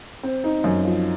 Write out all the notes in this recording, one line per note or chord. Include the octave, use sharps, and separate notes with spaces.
C4
D#4
F#2
F3